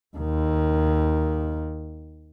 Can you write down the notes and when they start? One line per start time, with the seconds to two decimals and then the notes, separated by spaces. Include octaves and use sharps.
0.17 D#2 D#3